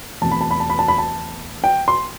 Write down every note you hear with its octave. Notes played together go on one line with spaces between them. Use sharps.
E2 B2 A3 C4 A5
B5
A5
B5
A5
B5
A5
B5
A5
G5
C6